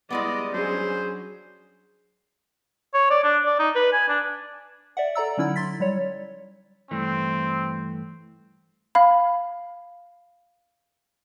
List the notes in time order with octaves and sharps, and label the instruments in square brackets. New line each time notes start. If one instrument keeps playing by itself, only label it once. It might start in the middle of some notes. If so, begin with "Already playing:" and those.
[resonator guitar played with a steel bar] G3 G#3 B3 [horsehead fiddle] E4 D#5 [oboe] D5
[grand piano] F#3 D4 [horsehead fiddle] C#4 G#4 [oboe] C5
[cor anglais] C#5
D5
D4
D5
D#4
B4
G#5
D4
[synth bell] D5 E5 F#5
A4 D5 A#5 E6
D3 F#3 C#4 D#4 E4 E6
C6 A6 B6
F#3 G3 C#5
[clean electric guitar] G2 E3 A3 [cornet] C4
[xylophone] F5 B5